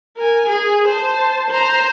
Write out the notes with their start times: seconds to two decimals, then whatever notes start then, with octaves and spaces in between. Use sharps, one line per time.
0.17 A#4 G#5
0.48 G#4
0.88 C5 A5
1.50 C5 A#5